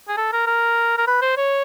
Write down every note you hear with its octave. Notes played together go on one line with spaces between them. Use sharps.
G#4
A4
A#4
A#4
A#4
B4
C5
C#5